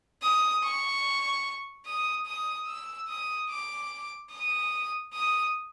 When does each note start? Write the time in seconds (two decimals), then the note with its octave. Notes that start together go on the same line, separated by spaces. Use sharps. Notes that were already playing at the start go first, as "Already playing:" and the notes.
0.22 D#6
0.63 C#6
1.86 D#6
2.26 D#6
2.67 E6
3.08 D#6
3.49 D6
4.30 D#6
5.13 D#6